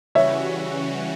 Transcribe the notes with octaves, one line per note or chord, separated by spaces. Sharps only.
C#3 E3 G3 C#4 F#4 C#5 E5